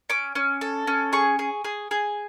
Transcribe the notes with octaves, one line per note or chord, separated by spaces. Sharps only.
C#4 D6
C#4
A4
C#4
G#4 C#6
G#4
G#4
G#4